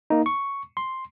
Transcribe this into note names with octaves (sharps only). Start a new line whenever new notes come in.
A#3 D#4
C#6
C6